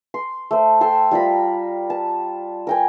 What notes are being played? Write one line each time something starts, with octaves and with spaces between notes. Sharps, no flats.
C6
A3 C5
A4 G5 C6
G3 F4 A#4 B5
A5
A#4 G5 G#5